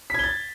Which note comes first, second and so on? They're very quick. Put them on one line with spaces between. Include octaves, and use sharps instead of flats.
B6 G#6 G7 A6